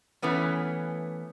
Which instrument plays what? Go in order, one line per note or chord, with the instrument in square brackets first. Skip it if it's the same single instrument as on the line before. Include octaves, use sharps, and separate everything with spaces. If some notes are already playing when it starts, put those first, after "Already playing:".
[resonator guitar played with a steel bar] E3 A3 B3 C#4